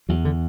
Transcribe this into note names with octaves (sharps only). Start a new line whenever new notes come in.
E2 F#3
D3